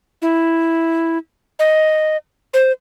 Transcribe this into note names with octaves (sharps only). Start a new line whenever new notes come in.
E4
D#5
C5